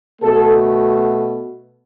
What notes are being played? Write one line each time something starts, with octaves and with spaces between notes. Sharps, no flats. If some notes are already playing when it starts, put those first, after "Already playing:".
B2 A3 A4